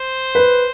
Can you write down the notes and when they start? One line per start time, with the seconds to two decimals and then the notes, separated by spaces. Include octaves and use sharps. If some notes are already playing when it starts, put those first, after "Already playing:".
Already playing: C5
0.35 B4